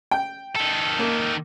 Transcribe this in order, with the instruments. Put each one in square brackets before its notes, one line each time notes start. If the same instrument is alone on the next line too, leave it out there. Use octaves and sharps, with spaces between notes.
[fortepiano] G5
[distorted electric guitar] D#3 A4
[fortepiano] A#3